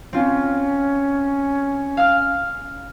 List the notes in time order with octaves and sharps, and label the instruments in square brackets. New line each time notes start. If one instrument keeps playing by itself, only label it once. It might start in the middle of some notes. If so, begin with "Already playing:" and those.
[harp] C4 F4 [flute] C#4
[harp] F5 F6